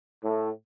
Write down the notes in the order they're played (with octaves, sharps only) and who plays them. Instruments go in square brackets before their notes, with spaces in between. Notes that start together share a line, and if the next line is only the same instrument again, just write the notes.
[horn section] A2